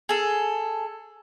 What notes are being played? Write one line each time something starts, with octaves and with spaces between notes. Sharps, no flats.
G#4 A4